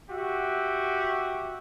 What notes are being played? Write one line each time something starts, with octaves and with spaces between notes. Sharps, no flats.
F#4 G4 E5